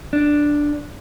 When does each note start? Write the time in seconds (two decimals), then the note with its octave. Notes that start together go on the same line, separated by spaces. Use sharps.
0.13 D4